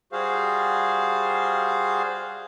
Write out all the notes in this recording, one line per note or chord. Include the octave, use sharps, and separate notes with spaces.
G3 F#4 G#4 C5 F5